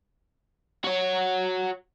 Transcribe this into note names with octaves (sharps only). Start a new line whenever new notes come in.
F#4 C#5